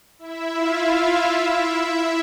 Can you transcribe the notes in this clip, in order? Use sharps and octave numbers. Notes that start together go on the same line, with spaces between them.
E4 E5
F4 F5
E4 E5